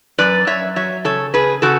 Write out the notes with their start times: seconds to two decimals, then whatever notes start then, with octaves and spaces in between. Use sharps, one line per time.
0.18 F#2 B4 D5
0.47 F#2 C#5 E5
0.76 F#3 C#5 E5
1.05 C#3 A4 C#5
1.34 C#3 G#4 B4
1.62 C#3 F#4 A4